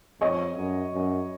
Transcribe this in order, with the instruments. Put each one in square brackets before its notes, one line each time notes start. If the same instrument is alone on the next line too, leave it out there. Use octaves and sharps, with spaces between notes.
[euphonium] F2 [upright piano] C#5 D#5
[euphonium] F#2
F#2